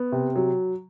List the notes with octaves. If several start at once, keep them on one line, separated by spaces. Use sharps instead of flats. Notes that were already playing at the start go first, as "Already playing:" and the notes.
Already playing: B3
C3
F#3